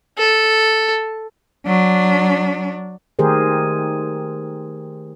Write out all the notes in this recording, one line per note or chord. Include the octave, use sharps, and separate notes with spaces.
A4
F#3 D4
D#3 A3 G4 G#4 A#4 C5